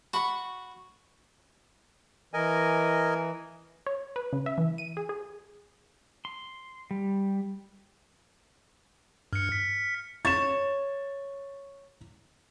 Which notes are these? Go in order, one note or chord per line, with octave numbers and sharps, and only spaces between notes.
F#4 B5 C#6
E3 A#4 D#5 G#5
C#5
B4
C#3
E5
E3
D#7
G#4
G#4
C6
G3
G2 F6 C#7
B6
C#5 A6 E7